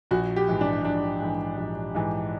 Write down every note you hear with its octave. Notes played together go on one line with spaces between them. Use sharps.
A#1 F#4
G4
G#2 E3
D4
A#1 D4
G#2 E3
A#1
G#2 E3